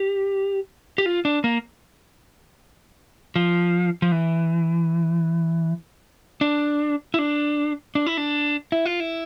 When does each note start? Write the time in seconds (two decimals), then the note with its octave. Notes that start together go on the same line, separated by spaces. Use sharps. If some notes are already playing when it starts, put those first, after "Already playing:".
Already playing: G4
0.98 G4
1.06 F4
1.25 D4
1.44 A#3
3.36 F3
4.02 F3
4.12 E3
6.41 D4
7.14 E4
7.19 D4
7.95 D4
8.07 E4
8.17 D4
8.72 E4
8.86 F4
9.00 E4